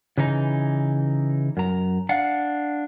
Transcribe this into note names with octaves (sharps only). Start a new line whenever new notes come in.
C#3 E3 D#4 A#5
F#2 A#5
D4 F5 F#5